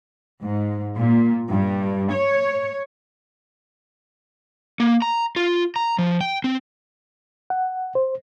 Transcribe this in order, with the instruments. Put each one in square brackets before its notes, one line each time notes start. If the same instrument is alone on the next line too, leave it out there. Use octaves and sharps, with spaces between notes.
[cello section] G#2
A#2
G2
C#5
[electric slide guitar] A#3
A#5
F4
A#5
F3
G5
C4
[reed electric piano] F#5
C5